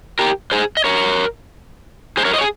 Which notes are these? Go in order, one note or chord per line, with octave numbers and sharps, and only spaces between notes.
G4 A#4
G#4 C5
D#5
A#4 C#5
G#4 C5
A#4 C#5
C5 D#5
C#5
G#4